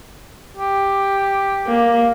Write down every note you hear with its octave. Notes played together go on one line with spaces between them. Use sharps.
G4
A#3